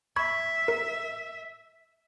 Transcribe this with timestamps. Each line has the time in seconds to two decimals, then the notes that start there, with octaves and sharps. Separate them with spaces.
0.16 E5 B5 C#6 G#6
0.68 A#4